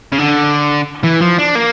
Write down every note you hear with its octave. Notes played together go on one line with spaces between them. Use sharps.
C#3
D3
E3
F3
D4
A#3